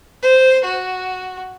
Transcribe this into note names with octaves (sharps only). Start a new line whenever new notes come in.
C5
F#4